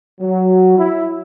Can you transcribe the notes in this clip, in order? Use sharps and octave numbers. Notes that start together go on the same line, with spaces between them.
F#3
E4